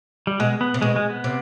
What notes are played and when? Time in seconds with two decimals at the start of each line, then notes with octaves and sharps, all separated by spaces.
0.27 G3
0.40 B2 G#3
0.61 B3
0.74 C3
0.81 B2 G#3
0.96 G#3
1.10 B3
1.24 C3